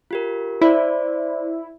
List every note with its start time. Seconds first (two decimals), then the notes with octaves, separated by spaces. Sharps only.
0.11 F4 G4 A#4
0.61 E4 C5 D5